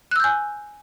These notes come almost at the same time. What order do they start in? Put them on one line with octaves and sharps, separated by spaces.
F#6 E6 G6 G#5